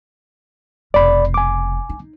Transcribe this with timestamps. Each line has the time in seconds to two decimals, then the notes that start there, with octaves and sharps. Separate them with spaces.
0.94 F1 B2 D5 B5
1.34 G#5 D6
1.89 D#4